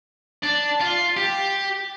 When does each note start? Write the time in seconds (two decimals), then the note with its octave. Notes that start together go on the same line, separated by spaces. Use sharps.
0.44 D4
0.81 F4
1.17 G4